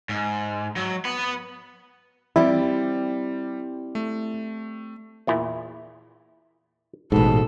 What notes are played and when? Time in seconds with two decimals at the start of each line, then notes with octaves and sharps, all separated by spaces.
0.09 G#2
0.76 F#3
1.05 B4 F#5
2.36 G3 C4 E4 G4 D5
3.95 A3
5.27 E2 A#2 E4
7.12 A1 G#2 B2 A4